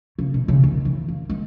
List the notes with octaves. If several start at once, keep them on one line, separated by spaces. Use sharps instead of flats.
C#3
B2
C#3
D#3
E3
A#3
G#3